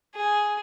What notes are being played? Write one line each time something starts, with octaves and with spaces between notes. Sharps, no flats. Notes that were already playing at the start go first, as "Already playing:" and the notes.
G#4